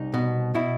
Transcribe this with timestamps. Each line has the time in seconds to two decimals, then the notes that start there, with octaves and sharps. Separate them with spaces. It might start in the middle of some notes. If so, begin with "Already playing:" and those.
Already playing: C2 D#4
0.14 B2
0.54 B2 E4